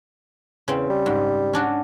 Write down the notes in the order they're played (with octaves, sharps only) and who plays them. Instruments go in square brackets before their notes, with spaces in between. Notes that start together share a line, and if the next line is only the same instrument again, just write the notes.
[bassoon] E2 [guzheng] C#3 C4
[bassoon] G3
[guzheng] G#2
C#4 D4 F#4